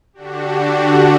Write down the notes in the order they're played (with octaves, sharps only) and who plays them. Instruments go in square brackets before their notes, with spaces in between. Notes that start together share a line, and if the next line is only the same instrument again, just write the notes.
[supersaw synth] D3 D4 F#4 G4